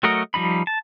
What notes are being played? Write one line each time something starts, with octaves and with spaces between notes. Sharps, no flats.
F#3 A3 F#4 A#4 D#5
F3 G3 D#4 B5
A5